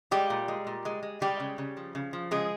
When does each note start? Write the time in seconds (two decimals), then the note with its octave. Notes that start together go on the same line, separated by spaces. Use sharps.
0.11 G3 G#3 G4
0.30 A#2
0.48 G#3
0.67 A#2
0.85 G#3
1.03 G#3
1.21 G3 G#3 G4
1.40 C#3
1.58 C#3
1.77 F3
1.95 C#3
2.13 F3
2.31 C#3 G#3 G#4